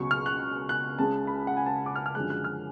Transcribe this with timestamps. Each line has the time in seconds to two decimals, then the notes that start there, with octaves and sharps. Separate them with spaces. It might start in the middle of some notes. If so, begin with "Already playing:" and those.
Already playing: C#2 B2 F#3 C#6
0.11 F6
0.26 F#6
0.69 F#6
0.99 C#2 C#3 G#3 A5
1.27 B5
1.47 F#5
1.57 G#5
1.66 A5
1.86 D6
1.96 F6
2.06 F6
2.15 F#2 D3 F3 G#3 F#6
2.30 F#6
2.44 F6